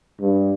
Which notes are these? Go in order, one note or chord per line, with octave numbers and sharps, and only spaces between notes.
G2